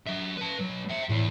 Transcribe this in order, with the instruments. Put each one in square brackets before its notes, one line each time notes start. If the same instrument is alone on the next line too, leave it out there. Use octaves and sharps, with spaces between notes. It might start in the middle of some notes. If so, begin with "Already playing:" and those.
[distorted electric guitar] F#3 E5
B4 A5
F#3 B3
E5 G5
[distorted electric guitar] E2 [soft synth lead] A2